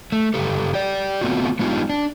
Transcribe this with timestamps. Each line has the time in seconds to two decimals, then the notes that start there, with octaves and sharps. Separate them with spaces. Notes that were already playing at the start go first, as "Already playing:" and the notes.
0.12 A3
0.34 G2 C#3 G4 A4
0.74 G4 D5
1.21 A3 B3 C4 F4 F#4
1.59 G#3 B3 D4 D#4 F4 G4
1.90 D4